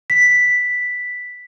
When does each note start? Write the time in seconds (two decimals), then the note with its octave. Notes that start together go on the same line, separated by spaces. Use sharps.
0.10 B6